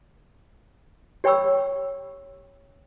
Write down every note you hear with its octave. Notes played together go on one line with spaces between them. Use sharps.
G4 C#5 G5 B5 C#6 E6